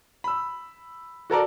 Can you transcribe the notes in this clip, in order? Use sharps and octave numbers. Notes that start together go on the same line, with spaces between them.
B5 E6
F#4 A4 A#4 D5